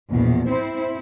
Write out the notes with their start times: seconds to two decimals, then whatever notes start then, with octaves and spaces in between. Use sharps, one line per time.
0.11 A#1 E2 B2
0.50 C4 E4 C5